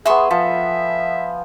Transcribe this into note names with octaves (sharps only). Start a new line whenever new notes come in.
B3 G#4 E5 G#5 C6 C#6
F3 A4 E5